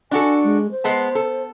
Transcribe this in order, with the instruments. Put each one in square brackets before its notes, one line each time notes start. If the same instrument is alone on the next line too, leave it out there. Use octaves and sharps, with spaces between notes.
[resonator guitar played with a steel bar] D4 F#4 A4 [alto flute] G#5
[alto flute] G#3
C5
[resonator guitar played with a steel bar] G#3 B3 A5
A4